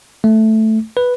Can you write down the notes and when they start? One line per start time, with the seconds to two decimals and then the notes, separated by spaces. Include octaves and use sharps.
0.24 A3
0.97 B4